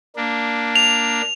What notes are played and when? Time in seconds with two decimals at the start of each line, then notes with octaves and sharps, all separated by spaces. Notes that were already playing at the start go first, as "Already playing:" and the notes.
0.16 A#3 D4
0.76 F7